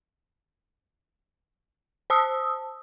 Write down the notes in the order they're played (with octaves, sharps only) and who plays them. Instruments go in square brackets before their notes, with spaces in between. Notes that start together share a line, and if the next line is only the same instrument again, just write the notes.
[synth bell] C5 A5 D#6 E6